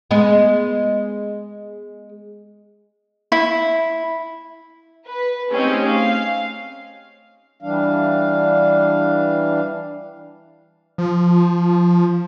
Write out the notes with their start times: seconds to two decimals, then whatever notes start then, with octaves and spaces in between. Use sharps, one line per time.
0.11 G#3 B3
3.32 E4
5.07 B4
5.53 A3 C4 C#4 D#4 G4 G#4
5.91 F5
7.62 E3 G3 D4 F5
10.98 F3